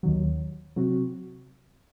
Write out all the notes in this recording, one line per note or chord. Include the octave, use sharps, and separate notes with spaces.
D#2 D#3 F#3
C3 F#3 C4 F#4